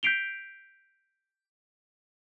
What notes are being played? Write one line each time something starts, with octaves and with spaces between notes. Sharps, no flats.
G6 B6 C7 D7 F7 G7